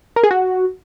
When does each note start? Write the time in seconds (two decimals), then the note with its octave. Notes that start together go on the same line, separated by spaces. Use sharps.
0.16 A#4
0.24 G#4
0.31 F#4